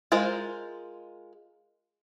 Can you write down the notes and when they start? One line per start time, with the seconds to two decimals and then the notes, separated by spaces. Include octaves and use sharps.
0.12 G#3 F4 A#4 C5